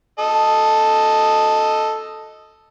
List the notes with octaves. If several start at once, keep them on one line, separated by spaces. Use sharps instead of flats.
A4 D#5